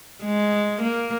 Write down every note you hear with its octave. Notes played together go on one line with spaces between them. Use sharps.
G#3
A#3